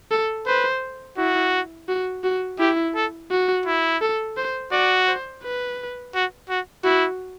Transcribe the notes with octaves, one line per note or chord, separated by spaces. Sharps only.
A4
B4 C5
E4 F#4
F#4
F#4
E4 G4
A4
F#4
E4
A4
C5
F#4 D5
C5
B4
F#4
F#4
E4 F#4